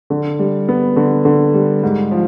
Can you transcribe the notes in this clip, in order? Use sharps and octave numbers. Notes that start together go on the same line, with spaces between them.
D3
G3
B3
D3
D3
G3
G#2
F3